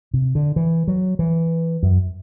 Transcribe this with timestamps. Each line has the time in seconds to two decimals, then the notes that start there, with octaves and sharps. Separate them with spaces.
0.14 C3
0.35 D3
0.56 E3
0.88 F#3
1.19 E3
1.83 F#2